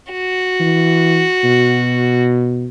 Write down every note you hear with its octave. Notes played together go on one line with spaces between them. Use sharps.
F#4
E3
B2